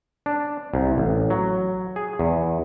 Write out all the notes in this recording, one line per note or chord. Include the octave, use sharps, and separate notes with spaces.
D4
C2
A1
F#3
G#4
E2